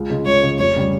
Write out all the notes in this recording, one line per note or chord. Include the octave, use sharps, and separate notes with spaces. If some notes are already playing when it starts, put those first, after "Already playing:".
Already playing: C#2
C#3 G#3
C#2 C#5
C#3 G#3
F1 C#5
C#3 G3 C#4